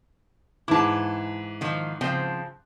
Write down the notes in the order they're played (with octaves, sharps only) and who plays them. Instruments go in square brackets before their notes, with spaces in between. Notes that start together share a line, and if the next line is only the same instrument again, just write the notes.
[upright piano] G#2 E3 D6 [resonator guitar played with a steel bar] E4 A5
[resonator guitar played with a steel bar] D#3 F3
C#3 F3 C4